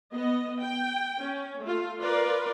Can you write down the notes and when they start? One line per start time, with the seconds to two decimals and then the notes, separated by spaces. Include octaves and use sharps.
0.13 B3 D#5
0.61 G5
1.22 C#4
1.65 A3 F4
2.02 F4 A#4 B4 D5